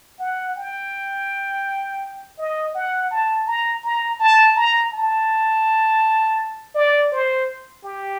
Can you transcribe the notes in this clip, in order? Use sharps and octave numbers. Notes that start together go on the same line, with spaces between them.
F#5
G5
D#5
F#5
A5
A#5
A#5
A5
A#5
A5
D5
C5
G4